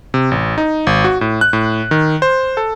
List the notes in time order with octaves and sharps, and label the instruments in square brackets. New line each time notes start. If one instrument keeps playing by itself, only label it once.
[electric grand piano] C3
A1
D#4
G#1
F#4
A2
F#6
A2
D#3
C5
A4